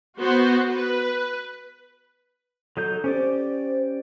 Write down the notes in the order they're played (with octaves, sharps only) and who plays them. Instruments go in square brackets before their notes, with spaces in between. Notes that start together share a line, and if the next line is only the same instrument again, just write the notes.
[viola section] B3 F#4 C5
B4
[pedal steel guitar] F#3 D#4 G6 [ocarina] A4
[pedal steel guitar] C#4 G4 D5 [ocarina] C5